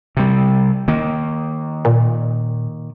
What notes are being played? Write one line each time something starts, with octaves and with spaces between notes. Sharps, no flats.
C3 G3
D#3 A#3
A#2